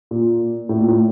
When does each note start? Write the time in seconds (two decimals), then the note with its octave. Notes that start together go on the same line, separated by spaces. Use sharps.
0.11 A#2
0.69 A2
0.79 A#2
0.88 A2